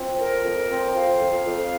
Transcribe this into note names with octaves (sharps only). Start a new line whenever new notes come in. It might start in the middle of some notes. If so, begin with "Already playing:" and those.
Already playing: F3 C4
F2 A#4
F2
C4
F3 F5
F2
F2